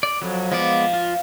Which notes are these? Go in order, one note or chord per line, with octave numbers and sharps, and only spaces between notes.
D5
F2 F#3
F3 G#3 B3 D5
F4